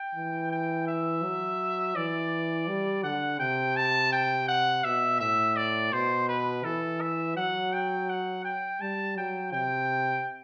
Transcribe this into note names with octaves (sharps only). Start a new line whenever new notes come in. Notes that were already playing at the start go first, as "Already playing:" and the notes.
Already playing: G5
E3
G5
E5
F#3
E3 D5
G3
D3 F#5
C3 G5
A5
G5
F#5
B2 E5
A2 E5
D5
B2 C5
B4
E3 A4
E5
F#3 F#5
G5
F#5
G5
G3 A5
F#3 G5
C3 G5